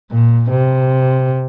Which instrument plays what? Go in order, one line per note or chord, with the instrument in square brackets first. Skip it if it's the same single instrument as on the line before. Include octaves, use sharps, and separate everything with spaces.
[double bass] A#2
C3